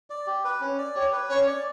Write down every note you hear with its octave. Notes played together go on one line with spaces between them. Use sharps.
D5
G4
B4
C#4
D5
G4 C#5
B4
C#4 C#5
D5